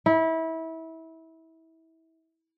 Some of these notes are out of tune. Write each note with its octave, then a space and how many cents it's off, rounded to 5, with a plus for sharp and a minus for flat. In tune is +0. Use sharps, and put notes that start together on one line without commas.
E4 -25